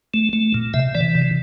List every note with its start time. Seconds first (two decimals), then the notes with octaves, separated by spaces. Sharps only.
0.14 A3
0.33 A3
0.54 A#2
0.74 C3 E5
0.95 E3 D5
1.15 C3